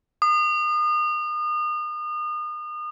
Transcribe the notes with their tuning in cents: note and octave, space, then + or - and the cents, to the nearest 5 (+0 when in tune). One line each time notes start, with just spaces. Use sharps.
D#6 -35